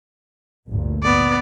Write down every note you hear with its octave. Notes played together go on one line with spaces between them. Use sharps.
G1 D2 A#2
B3 D5